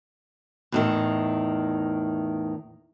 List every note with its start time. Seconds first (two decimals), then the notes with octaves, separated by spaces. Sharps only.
0.72 E2 A2 D#3